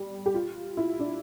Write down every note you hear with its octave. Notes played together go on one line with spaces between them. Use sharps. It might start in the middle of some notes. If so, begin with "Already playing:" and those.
Already playing: G3
G4
F4
E4
D4